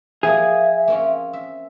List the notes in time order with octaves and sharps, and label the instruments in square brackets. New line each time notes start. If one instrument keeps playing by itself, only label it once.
[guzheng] F3 A#3 [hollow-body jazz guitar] G#4 [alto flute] E5
[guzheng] A#3 C4 C#4
E5